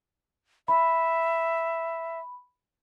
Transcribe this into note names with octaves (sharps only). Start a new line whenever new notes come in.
E5 B5